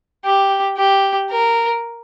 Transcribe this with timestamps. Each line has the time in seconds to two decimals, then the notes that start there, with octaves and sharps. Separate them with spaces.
0.25 G4
0.77 G4
1.30 A#4